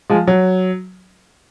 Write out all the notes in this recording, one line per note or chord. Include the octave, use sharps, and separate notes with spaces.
F3 G#3
F#3